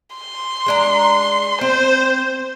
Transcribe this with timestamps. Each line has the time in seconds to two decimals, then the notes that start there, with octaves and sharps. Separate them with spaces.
0.16 C6
0.66 G#3 D4 A#5
1.61 C4 C5